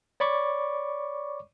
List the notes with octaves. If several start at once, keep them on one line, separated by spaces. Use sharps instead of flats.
C#5 D5 B5 C#6 D6